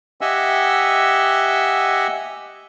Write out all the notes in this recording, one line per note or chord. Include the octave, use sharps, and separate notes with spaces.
G4 D#5 E5 F#5 G#5 E6